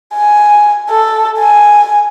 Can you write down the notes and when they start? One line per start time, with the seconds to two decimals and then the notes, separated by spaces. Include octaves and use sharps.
0.14 G#5
0.90 A4
1.39 G#5